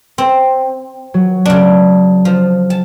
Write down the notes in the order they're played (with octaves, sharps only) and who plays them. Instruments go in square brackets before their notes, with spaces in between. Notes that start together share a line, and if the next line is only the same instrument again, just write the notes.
[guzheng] C4
[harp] F#3
[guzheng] C#3 D4
F3
A5